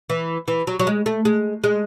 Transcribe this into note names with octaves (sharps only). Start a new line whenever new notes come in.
E3
E3
F#3
F#3
G#3
A3
G#3
G#3